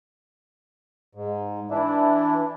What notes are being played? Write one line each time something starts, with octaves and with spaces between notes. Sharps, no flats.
G#2
E3 D4 E4